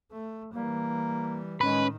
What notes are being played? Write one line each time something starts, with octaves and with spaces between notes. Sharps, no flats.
A3
E3 G3 A#3
A2 D#3 G#3 C#4 B4 B5